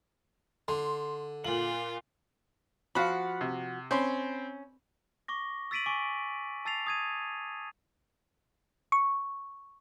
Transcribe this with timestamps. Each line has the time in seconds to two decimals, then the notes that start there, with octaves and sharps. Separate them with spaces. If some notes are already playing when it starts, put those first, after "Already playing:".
0.68 D3 C6
1.44 A#2 F4 F#7
2.95 F3 F#4 F5 F#5 B5
3.41 C3
3.91 C4 C#4 B5 C6
5.28 C#6 D6 A#6
5.71 E6 A6 B6 D7 D#7 F#7
5.86 G#5 C#6 D6
6.65 A5 E6 A6 C7 F7
6.87 D#6 G#6 D#7
8.92 C#6